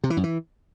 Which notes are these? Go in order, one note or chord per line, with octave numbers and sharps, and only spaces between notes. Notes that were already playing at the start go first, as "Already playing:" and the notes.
C3
E3
F#2
E3